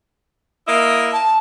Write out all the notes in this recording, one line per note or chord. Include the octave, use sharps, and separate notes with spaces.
A#3 E4 D#5
A5